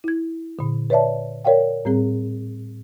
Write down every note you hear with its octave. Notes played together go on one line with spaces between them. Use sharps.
E4 G#6
A#2 D3
B4 C#5 D5 E5 A5
A#4 C#5 D5 F5 G5
A2 G3 C4 G#4